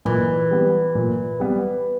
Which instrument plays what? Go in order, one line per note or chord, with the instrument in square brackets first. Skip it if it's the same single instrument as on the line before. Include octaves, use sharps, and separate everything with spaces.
[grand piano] A#2 [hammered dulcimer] E3
[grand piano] G3 B3
A#2
G3 B3